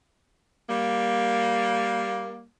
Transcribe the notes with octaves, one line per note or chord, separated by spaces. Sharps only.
G3 A#3